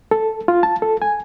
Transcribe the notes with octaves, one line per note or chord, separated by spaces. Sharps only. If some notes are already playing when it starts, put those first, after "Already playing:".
A4
F4
A5
A4
G#5